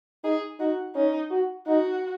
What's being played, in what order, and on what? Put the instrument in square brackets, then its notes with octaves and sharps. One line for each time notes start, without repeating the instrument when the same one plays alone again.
[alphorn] D#4 [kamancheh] G#4
[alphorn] D#4 [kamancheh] F#4
[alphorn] C#4 [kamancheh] D#4
[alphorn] F#4
[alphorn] D#4 [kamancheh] F#4